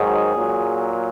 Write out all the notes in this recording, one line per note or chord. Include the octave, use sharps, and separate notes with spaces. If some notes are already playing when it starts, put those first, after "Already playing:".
Already playing: G#2 D#3 F#3 G#4
A#2 F#3